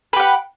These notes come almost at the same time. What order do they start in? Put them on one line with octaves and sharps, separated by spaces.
B4 G4 F#5